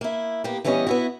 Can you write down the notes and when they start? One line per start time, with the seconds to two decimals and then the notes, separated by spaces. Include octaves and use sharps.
0.01 A#3 E4
0.44 A#3 B3 G4
0.65 E3 G3 B3 C#4 E4 D#5
0.87 B3 E4 F#4